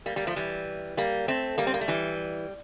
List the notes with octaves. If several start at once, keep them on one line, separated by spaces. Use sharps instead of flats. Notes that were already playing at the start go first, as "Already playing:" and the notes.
G3 A#3
G3 A#3
F3 A3
E3 G3
G3 A#3
A3 C4
G3 A#3
C4
A#3
A3
E3 G3